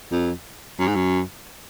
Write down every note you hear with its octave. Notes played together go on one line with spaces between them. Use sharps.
F2
F#2
G#2
F#2